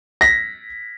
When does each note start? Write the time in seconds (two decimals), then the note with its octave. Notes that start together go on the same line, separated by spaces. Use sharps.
0.21 A#6 B6